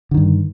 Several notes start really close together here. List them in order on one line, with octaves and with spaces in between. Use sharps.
D3 D#3 G2